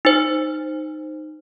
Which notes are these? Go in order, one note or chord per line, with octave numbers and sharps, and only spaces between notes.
D#4 C5